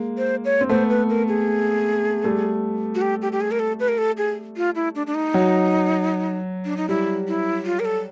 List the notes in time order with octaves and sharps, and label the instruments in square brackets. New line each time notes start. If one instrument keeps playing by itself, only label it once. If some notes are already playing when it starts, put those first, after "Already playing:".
Already playing: [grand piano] G#3 A#3
[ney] C5
C#5
[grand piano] C4
[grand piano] A3 B3 [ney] C5
[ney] B4
A#4
G#4
[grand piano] G3 A3
[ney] F#4
G4
G4
G4
G#4
A#4
A4
B4
A#4
A4
G#4
F4
E4
D4
D4
D#4
[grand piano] F#3
[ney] D4
D#4
[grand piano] G3 [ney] E4
[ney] E4
F4
A#4
A4